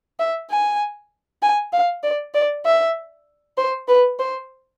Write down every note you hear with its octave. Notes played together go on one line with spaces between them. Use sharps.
E5
G#5
G#5
F5
D5
D5
E5
C5
B4
C5